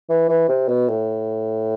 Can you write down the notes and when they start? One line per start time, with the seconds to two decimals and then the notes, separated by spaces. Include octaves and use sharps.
0.10 E3
0.29 E3
0.49 C3
0.69 B2
0.88 A2